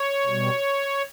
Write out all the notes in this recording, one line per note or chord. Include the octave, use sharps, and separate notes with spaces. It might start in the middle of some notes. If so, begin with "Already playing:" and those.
Already playing: C#5
B2 G3